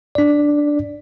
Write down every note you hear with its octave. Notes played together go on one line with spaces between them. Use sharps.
D4 D5